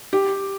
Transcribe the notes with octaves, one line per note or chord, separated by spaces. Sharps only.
G4